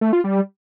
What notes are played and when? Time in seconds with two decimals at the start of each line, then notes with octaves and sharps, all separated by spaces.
0.01 A3
0.13 F4
0.24 G3